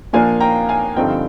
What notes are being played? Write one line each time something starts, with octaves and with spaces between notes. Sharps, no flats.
A#2 F3 A#3 D4 F5 G#5
G5 A#5
F5 G#5
G2 D3 F3 C4 D#4 G5
F5